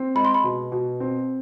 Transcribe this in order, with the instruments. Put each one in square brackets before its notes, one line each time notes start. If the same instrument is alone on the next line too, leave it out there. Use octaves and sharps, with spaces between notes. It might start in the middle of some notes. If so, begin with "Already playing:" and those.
Already playing: [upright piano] C4
[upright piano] G#3 [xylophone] B5
[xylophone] C6
B5
[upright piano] B2
B2
C4